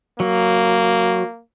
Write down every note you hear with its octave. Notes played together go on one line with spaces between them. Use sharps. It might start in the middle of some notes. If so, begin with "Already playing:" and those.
F#3 A#3